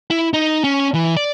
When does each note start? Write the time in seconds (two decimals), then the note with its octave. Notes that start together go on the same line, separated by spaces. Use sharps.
0.10 E4
0.33 D#4
0.64 C#4
0.94 E3
1.17 D5